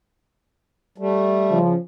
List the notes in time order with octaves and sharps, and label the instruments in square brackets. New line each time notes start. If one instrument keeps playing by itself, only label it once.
[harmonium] G3 A3
[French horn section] C#3 F3